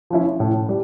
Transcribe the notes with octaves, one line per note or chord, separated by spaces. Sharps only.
F3 C#4 E4
A2
G3